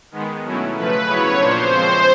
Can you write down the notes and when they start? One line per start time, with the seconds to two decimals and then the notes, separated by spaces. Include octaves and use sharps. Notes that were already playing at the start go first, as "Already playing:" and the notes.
0.11 D#3 G#3 B3
0.43 B2 F#3 A3 C#4 E4
0.74 C#3 F3 A3 B4
1.06 C#3 F#3 B3 E4 C#5
1.37 A#2 F3 A#3 D4 C5
1.69 F3 G#3 C4